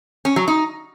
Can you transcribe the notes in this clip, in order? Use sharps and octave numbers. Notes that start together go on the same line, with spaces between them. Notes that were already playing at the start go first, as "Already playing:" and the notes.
C#4
F#3
D#4